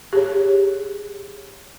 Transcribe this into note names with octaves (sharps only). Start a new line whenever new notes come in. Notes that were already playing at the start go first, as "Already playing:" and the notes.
G4 G#4 C#5